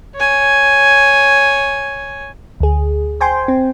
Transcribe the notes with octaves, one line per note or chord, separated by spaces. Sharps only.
C#5 G#5
D2 G#4
C5 G5 G#5 C6
C4